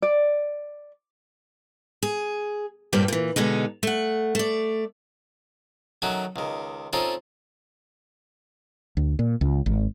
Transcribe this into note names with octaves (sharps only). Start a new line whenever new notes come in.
D5
G#4
G2 A#2 G3 A#3 C4 G4
A#2 E3
B2 D3 G#3 D#4
A3 F#5
A3 D5
D#3 F#3 A3 C#4 F#4
C#2 D#3
C4 C#4 D#4 F4 A4 A#4
D2
A#2
C#2
G#1